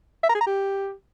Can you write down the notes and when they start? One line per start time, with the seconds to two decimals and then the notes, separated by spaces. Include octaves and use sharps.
0.23 E5
0.29 A#5
0.35 G#4
0.40 A#5
0.46 G4